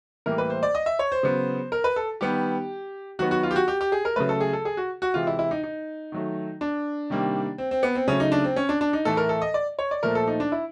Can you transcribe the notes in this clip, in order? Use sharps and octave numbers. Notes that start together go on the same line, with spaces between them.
A2 E3 G3 A#3 A#4
B4
C5
D5
D#5
E5
C#5
C5
C#3 F#3 B3
A#4
B4
A4
D#3 G3 B3 G4
D#3 F#3 B3 F#4
F#4
F4
G4
F#4
G4
G4
G#4
A#4
C#3 F#3 A3 B4
A4
G#4
A4
G#4
F#4
F#4
C3 E3 G#3 F4
E4
E4
D#4
D#4
D#3 F#3 A3
D4
C3 D#3 G3 A#3
C4
C4
B3
C4
C#3 F#3 A3 C#4
D#4
D4
C4
C#4
D4
D4
D#4
A2 E3 A3 A4
A#4
A4
D#5
D5
C#5
D5
A#2 F3 A3 A#4
A4
D#4
D4
E4